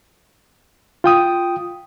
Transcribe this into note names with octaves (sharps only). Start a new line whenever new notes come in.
F4 G5 D#6